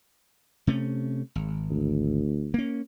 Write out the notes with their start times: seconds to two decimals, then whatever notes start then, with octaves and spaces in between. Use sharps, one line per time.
0.67 C3 A3 C#4
1.35 G#1
1.71 D2
2.54 A#3 C#4